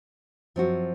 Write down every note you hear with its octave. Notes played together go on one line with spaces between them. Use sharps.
F#2 F3 C4 F#4